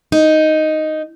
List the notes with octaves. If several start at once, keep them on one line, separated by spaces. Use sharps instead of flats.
D#4